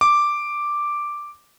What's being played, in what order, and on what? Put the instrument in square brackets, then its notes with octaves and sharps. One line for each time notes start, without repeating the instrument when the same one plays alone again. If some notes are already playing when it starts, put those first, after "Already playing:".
[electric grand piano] D6